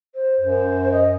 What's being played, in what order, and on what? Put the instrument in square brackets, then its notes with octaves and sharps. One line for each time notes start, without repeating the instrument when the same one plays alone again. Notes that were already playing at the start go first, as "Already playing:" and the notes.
[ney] C5
[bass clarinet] F#2 [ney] C5
[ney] D#5